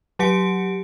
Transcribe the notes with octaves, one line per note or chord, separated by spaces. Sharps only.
F#3 G4 F#5 C#7 D7